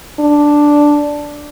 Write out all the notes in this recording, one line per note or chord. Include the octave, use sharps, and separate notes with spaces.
D4